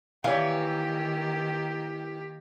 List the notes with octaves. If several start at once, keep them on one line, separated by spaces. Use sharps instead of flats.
D#3 E3 A#3 G4 C#5 F5